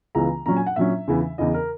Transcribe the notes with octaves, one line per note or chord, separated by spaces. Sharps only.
C#2 C#3 E3 B3 A#5
A#2 F#3 C#4 A#5
G#5
F#5
A#2 F#3 C#4 E5
E2 C#3 E3
E2 C#3 E3 D#5
A#4